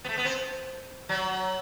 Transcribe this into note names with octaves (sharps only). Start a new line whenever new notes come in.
B3
A3
B3
C4
F#3